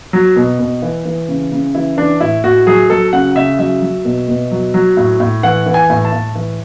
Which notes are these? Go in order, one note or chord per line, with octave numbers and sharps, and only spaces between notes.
F#3
B2
B2
E3
E3
C#3
C#3
E3 E4
E3 D4
A2 E4
A2 F#4
F#3 G#4
F#3 A4
C#3 F#5
C#3 E5
F#3 E5
F#3
B2
B2
F#3
F#3
A2
A2
E3 F#5
E3
G#5
A2
A5
A2
E3